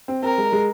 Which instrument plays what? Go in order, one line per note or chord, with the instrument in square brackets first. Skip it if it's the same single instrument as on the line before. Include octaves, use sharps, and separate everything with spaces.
[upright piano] C4
[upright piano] C4 [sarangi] A#4
[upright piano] G#3
G#3